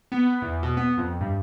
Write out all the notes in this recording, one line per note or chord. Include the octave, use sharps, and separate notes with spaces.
B3
E2
B2
B3
F2
G2